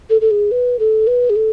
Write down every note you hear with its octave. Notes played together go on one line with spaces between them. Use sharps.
A4
A4
G#4
B4
A4
B4
G#4
A4